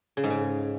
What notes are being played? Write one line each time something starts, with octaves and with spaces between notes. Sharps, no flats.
C#3
G#2
C#3